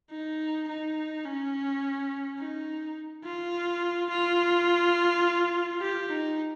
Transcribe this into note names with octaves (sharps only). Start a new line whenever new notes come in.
D#4
D#4
C#4
D#4
F4
F4
G4
D#4